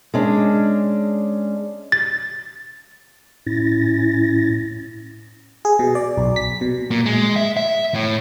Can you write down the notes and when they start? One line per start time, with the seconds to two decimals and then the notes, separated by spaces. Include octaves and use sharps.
0.14 G#3 C#4 D4
1.92 A6
3.46 A2 C#4 E4 A6 A#6
5.65 G#4
5.79 B2
5.95 D5
6.17 B1
6.36 B6
6.61 B2
6.91 A#2
7.06 G#3
7.36 E5
7.57 E5
7.95 A2